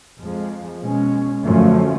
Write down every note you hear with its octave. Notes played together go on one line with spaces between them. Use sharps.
F2 F3 G#3
B2 G#3 C#4
F#2 D3 F3 A3 C#4